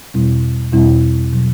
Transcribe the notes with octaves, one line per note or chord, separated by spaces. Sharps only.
E2 B2 G3 C4 E4
E2 B2 G3 C4 E4
B2 F#3